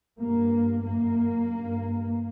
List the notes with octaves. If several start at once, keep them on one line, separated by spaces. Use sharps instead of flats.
G2 A#3
F#2 A#3
G2